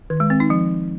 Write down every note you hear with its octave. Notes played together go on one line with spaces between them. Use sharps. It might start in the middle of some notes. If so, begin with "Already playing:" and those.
D#3
G#3
C4
D#4
F3